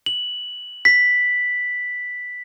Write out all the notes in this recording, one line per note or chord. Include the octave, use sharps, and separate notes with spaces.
F#7
B6